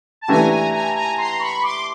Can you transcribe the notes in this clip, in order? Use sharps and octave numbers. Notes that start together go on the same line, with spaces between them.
A5
E3 A3 D4 G4 G#5 A#5
G#5 A#5
G#5 A#5
G#5 A#5
A#5 C6
B5 C#6
C6 D6